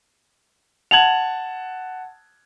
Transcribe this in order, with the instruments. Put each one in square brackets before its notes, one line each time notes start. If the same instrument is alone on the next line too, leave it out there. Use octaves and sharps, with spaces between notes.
[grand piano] F#5 A5 G#6 [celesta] F7 F#7